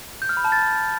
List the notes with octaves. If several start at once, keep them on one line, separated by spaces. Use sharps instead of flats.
G6
F6
B5
A5
A6